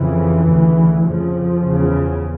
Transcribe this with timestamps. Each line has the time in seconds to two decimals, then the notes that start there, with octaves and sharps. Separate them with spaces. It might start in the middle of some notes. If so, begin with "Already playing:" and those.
Already playing: F2 C#3 E3
0.49 D2 C#3
1.07 F2 C#3 F3
1.66 E2 C#3